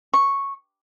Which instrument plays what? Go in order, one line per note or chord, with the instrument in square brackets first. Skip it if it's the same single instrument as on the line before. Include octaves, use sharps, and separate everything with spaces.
[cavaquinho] C#6